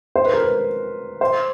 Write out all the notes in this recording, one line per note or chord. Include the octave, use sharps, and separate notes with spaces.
C5
B4
A#4
B4
C5